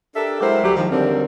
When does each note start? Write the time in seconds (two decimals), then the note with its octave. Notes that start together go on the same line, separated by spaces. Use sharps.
0.15 D4 G4 A4 A#4 E5
0.40 F#3 G#3 E4 G4 A#4 C5
0.63 D2 F#3 G3 G4
0.75 D#3 F3
0.90 D#2 D3 F#3 G3 C4 A#4